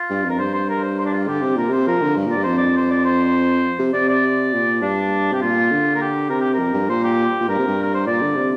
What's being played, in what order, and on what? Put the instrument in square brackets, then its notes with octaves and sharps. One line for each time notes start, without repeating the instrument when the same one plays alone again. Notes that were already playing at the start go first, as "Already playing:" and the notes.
Already playing: [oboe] F4
[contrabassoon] G2
[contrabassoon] F2 [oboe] A#4
[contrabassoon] G2 [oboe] C5
[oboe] C5
A#4
C5
C5
D4
F4
[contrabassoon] D3 [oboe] G4
[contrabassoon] C3
[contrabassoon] A#2 [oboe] A#4
[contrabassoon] C3 [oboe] C5
[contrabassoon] F3 [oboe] A#4
[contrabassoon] D3
G2
[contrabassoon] A#2 [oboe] D5
[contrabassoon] G2
[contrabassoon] F2 [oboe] C5
[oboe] D5
C5
D5
C5
[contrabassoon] C3
[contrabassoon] C3 [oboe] D5
[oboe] D5
[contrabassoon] A#2
[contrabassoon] G2 [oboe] D4
[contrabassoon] C3 [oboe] G4
[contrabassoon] A#2 [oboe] F4
[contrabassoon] D3
[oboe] A#4
G4
[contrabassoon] C3 [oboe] A#4
[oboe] G4
A#4
[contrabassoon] F2
G2
[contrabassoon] A#2 [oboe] C5
[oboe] G4
[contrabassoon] A#2
[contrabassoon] G2 [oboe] A#4
[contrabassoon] C3
G2
[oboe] A#4
C5
[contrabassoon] A#2 [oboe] D5
[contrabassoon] D3
C3